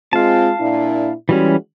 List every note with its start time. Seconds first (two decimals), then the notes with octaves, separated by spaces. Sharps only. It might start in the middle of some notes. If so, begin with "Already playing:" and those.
0.13 G#3 C4 F4 F5 A5
0.60 A#2 D4 E4
1.29 E3 G3 G#3 C#4 F#4